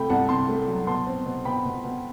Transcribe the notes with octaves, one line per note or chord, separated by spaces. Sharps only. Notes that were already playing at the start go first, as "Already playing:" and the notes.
Already playing: C3 A3 G5 B5
C2 F#5 A5
C3 A5 C6
A3
F#3
B2 A5 C6
C4
B2
B2 G5 B5
B2
B2